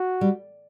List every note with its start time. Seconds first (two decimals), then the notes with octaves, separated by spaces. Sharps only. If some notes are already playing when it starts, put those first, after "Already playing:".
Already playing: F#4
0.21 G3